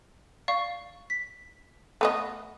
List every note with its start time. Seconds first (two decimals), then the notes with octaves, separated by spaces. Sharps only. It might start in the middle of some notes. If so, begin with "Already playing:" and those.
0.48 D5 F5 C#6
1.10 B6
2.01 A3 B3 D#5